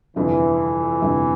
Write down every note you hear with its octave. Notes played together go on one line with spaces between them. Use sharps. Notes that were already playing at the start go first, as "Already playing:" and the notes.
G1 F2 C3 E3
G1 F2 C3